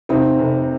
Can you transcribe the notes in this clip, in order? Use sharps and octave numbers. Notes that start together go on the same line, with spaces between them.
C3 C4 D#4
F1